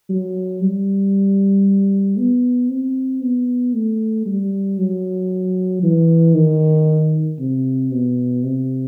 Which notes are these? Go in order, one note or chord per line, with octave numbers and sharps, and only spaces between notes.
F#3
G3
B3
C4
B3
A3
G3
F#3
E3
D#3
C3
B2
C3